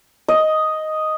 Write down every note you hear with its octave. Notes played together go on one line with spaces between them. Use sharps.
D#5